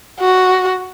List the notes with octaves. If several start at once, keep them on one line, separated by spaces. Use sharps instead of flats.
F#4